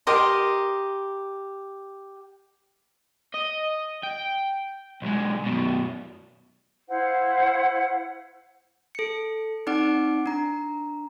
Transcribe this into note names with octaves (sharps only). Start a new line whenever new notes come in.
G4 A#4 D#5 C6
D#5
G5
B1 G#3
F#2 B2
E4 C5 F5 F#5
A4 C#7
C4 D#4 D5 F#5 D6 D7
D4 A#5